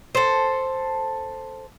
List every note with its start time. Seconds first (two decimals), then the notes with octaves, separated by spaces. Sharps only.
0.15 A4 C5